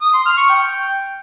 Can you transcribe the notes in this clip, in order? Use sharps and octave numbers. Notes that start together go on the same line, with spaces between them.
D#6
C6
F6
C#6
G5